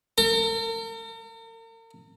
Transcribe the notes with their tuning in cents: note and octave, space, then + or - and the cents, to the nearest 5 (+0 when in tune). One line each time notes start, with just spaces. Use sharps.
A#4 -45